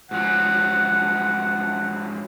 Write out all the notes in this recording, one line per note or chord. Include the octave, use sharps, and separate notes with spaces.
G#2 F3 F#3 F#5